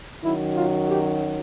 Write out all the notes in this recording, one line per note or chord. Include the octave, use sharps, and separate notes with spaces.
F#2 D#3 F#3 E4
F4
G4